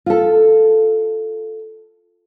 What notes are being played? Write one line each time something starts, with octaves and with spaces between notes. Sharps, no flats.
F4 A4